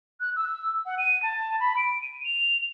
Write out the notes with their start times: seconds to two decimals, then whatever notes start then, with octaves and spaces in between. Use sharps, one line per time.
0.20 F#6
0.36 E6
0.86 F#5
0.98 D#7
1.23 A5
1.60 B5
1.77 D7
2.02 D#7
2.24 F7